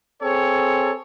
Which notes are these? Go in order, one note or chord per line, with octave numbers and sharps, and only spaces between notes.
C4 G#4 A4 C#5